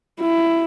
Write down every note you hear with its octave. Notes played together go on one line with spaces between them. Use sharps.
E4